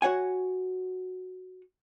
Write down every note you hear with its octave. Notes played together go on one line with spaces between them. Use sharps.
F#4 C#5 F#5 G#5